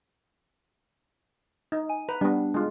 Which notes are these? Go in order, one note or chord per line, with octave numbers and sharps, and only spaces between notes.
D#4
G#5
B4 A#5
G3 B3 D4
G#3 F4